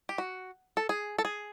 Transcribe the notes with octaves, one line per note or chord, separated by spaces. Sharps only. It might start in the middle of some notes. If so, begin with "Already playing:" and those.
G4
F#4
A4
G#4
A4
G#4